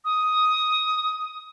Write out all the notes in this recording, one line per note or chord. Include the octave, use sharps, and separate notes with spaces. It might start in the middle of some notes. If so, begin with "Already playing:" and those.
D#6